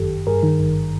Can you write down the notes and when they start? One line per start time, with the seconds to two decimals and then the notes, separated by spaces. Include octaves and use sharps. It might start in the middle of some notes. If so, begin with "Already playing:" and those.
Already playing: G1 F#2 D#3 G4 A4
0.10 G1
0.27 G2 G#4 A#4
0.43 D#3
0.60 G#1